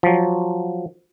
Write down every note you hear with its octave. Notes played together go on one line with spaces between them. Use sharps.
F3 F#3